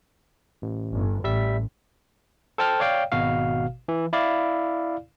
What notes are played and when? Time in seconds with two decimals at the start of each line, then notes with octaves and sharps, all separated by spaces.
0.62 A1
0.92 G1
1.24 A1 G3 E5 B6
2.58 A4 C5 G5 A5 E6 F6
2.80 C#5 D5 F5 G5
3.12 G#1 B2 F#4 F5
3.88 E3
4.13 E4 D5 F5